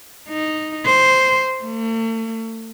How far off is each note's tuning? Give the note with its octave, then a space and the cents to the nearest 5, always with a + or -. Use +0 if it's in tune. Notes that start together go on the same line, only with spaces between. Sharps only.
D#4 -5
C5 -5
A3 +40